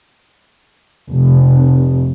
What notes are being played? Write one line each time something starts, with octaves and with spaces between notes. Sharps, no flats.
F1